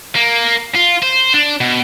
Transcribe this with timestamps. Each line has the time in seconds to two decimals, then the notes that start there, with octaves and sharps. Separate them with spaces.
0.15 A#3
0.75 F4
1.02 C5
1.34 D4
1.61 B2